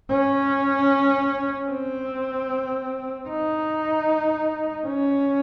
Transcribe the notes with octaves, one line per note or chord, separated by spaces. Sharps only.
C#4
C4
D#4
C#4